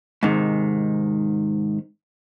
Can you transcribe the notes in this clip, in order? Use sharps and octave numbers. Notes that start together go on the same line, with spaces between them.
G#2 C3 D#3